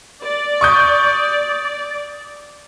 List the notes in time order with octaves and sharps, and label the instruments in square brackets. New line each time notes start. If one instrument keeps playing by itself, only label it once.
[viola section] D5
[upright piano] C#6 D#6 G6